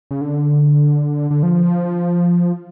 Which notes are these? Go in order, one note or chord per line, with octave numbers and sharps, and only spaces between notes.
C#3
D3
D3
F3